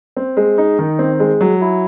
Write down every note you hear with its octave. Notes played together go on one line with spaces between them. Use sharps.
C4
G#3
D#4
D#3
C4
G#3
F#3
E4